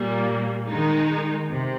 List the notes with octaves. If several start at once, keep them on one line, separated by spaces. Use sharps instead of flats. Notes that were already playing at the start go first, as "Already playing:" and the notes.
Already playing: A#2 G3 A#3
D#3 G#3 D#4
C3